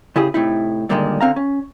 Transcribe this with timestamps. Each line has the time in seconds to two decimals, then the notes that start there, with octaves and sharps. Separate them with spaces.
0.16 C#3 E4 G4 G#4
0.34 A2 C3 D#4 E4
0.89 G2 A#2 D3 D#3 G3 G#3
1.21 D3 C4 F5 A#5
1.36 C#4